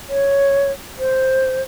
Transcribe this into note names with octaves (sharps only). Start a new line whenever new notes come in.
C#5
C5